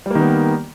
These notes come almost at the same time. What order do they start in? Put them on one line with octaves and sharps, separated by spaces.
G3 A#3 D#3 B3